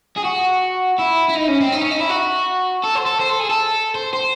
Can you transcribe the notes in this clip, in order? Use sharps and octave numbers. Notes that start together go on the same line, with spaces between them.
G#4
F#4
E4
E4
D#4
C#4
C4
D#4
C#4
D#4
E4
F#4
A4
C5
A4
C5
A4
G#4
A4
C5
C5